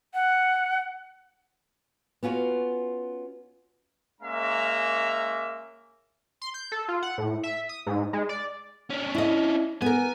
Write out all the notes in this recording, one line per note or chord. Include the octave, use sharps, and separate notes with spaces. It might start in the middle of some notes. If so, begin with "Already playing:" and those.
F#5
B3 C#4 F4 F#4
G#3 A#3 C#4 E5 A#5
C6
G6
A4
F4
F#5
A2
E5
D#6
G#2
G#3
D5
C#4 D4
E4 D#5
B3 A#4 G#5